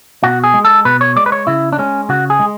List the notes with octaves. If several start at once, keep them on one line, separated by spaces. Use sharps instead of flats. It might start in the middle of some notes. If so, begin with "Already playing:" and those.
B2 F#4
G#4
G#3
A4
B2 B4
C#5
G#3 D5
B4
C#5
C#3 E4
D4
G#3 C#4
C#3 F#4
G#4
G#3